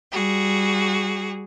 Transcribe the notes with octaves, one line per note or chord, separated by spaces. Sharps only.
G3 F#4 G#4